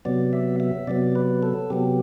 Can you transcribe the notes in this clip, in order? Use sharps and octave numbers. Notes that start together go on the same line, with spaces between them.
C3 F#3 B3 D5
E5
E5
C3 F#3 B3 D5
B4
A4
C3 F#3 B3 G4